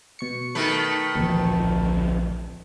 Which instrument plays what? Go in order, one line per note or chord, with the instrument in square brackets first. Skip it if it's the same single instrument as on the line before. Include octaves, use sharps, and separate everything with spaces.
[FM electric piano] B2 C#6 C#7
[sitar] D#3 A3 B4
[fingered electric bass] D1 E3 F3 [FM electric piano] A#1